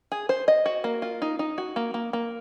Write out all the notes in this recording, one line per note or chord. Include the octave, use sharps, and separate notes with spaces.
G#4
C5
D#5
F#4
A#3
F4
D#4
D#4
F#4
A#3
A#3
A#3